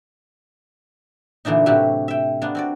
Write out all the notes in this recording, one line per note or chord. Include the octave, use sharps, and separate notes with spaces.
A#2 D3 E3 D4 D#4
A2 C3 F#3 E4 F#4 G4
E5 G5
A#3 B3 D4
C4 F#4 D5